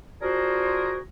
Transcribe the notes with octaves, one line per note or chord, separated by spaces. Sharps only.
D4 F4 F#4 G#4 A#4 C5